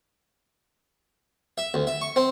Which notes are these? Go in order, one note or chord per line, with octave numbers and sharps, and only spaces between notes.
E5
D2
E5
C#6
C4